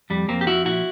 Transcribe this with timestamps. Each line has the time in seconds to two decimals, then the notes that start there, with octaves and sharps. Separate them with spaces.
0.10 F2 G3
0.28 F2 A#3 C4
0.41 G4
0.46 F3 E4 F#4
0.65 A#2 E4 F#4